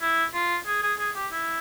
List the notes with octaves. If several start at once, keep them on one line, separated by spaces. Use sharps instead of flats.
E4
F4
G#4
G#4
G#4
G4
E4